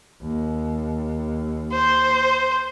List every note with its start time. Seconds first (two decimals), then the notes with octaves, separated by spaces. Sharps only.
0.22 D#2
1.72 C5